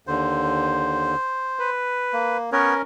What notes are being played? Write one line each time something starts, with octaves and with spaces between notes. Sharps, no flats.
D#2 D3 C5
B4
A#3
B3 C#4 A#4 B4 C#5